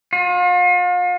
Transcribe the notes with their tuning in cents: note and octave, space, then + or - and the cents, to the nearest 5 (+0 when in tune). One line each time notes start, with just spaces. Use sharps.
F4 +40